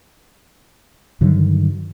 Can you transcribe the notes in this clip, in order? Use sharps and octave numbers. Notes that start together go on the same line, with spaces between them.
G2 D3 D#3 F#3